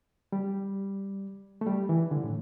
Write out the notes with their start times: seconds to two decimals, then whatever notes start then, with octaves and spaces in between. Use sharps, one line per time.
0.32 G3
1.61 A3
1.67 G3
1.89 E3
2.11 D3
2.24 A2